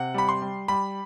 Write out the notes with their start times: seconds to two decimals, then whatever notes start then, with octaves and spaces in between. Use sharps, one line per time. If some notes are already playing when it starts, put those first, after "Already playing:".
Already playing: C3 F#5
0.14 G3 B5
0.29 C6
0.42 G3
0.68 G3 B5